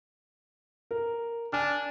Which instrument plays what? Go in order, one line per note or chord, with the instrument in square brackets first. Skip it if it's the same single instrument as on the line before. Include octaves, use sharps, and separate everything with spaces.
[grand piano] A#4
[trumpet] D4 [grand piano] G#5 F6